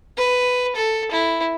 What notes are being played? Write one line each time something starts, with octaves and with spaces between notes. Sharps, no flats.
B4
A4
E4